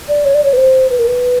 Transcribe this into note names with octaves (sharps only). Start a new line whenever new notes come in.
D5
C#5
D5
C#5
B4
C5
B4
A#4
B4